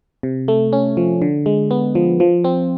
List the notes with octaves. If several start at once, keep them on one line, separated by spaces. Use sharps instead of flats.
C3
A3
C#4
F3
D3
G#3
B3
F3
F3
C4